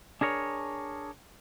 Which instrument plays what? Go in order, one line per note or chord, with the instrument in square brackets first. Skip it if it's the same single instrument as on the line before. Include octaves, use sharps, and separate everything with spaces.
[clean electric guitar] D4 G#4 A#4 C#5